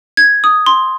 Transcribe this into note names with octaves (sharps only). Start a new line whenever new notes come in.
G#6
D#6
C6